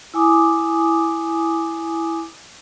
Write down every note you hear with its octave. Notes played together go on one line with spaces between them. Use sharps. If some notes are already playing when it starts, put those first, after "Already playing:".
E4 G#5 D6 D#6